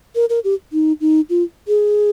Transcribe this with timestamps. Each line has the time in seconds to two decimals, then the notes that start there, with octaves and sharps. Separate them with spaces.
0.15 A#4
0.30 A#4
0.44 G4
0.73 D#4
1.01 D#4
1.30 F4
1.68 G#4